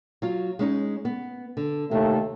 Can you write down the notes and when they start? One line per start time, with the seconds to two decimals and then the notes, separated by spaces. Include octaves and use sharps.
0.22 F#3 F4
0.59 G#3 C#4 D#4
1.05 B3
1.57 D3
1.91 D#2 C3 A3